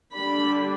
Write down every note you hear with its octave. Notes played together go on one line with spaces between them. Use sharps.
D3 G3 D4 B5